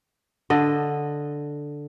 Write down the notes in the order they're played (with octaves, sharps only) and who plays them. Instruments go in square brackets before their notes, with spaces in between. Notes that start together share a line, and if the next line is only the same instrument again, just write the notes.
[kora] D3 D#5